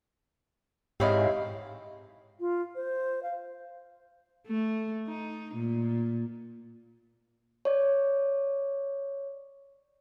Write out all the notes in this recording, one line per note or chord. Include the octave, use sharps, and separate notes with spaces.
G#2 C4 E4 G4 C#5 D#5 F5
F4
C5
F5
A3
D#4
A#2
C#5 D5